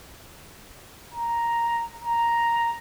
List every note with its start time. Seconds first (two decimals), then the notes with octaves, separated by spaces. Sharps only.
1.14 A#5
2.04 A#5